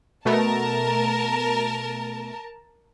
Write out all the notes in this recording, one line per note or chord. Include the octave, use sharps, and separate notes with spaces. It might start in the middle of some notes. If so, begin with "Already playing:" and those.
B2 A3 B3 A#4 A5